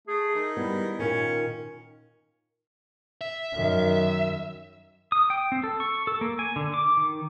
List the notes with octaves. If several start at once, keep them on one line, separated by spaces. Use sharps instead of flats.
A3 G#4
D#3
G3 B3 E4
A#2 D#3 C#4
E5
F#2 D#3
D#6
G5
C4
A4
C#6
A4
A#3
G#5
D3
D6
D#3